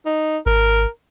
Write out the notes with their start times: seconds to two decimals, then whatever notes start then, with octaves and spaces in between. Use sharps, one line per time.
0.06 D#4
0.46 G#1 A#4